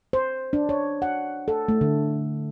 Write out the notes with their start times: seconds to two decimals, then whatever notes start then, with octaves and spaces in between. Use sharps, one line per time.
0.13 C5
0.53 D4
0.69 C#5
1.02 F#5
1.48 A4
1.68 A3
1.81 D3